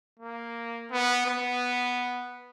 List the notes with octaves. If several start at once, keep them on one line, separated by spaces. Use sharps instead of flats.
A#3
B3
B3